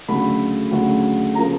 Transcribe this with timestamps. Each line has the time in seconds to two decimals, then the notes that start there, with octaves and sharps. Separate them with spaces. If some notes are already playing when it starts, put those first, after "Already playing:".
0.08 D2 C#3 F#3 A3 B5
0.72 D2 C#3 F#3 A3
1.35 C#3 F3 A#3 A#5